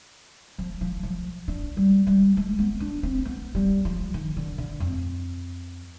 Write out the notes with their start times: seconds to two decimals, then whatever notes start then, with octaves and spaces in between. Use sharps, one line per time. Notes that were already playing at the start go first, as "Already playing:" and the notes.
0.58 F3
0.81 F3
1.03 F3
1.48 D4
1.77 G3
2.07 G3
2.37 G#3
2.59 B3
2.80 D4
3.03 C4
3.25 B3
3.55 G3
3.85 F3
4.14 D#3
4.37 D3
4.58 D3
4.80 F2